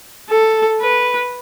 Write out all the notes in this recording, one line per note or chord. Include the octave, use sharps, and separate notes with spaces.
A4
B4